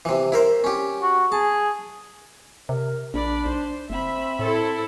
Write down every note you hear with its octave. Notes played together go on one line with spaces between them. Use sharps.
C3 E3
E4 A#4 C5
C#4 G4
F#4
G#4 A5
C3 A#4
A#1 D4 D5 B5
B1 C5
F#1 C4 E5 B5
A2 E4 A4